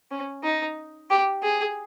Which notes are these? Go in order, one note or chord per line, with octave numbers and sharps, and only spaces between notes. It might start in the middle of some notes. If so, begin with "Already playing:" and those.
C#4
D#4
G4
G#4